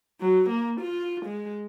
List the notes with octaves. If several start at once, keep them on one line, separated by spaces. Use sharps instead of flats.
F#3
A#3
F4
G#3